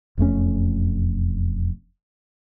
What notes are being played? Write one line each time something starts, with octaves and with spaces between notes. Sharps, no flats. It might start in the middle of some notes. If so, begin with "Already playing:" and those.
E1 F2 A3 C#4